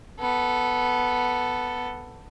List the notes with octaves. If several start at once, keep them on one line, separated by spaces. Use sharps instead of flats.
B3 A4